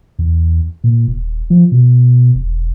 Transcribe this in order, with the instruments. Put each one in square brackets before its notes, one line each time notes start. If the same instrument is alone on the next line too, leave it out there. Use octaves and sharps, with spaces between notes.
[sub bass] E2
A#2
D#1
F3
B2
E1